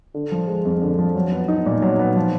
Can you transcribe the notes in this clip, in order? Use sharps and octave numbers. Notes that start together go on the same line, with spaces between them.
D3
F3
G#3
F2
D3
F3
F#3
B3
D#4
A#2
F#3
B3
F3